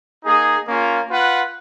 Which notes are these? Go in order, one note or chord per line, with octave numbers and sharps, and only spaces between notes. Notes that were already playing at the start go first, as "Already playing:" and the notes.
A#3 D#4 G#4
A#3 C#4 F4
F4 B4 F#5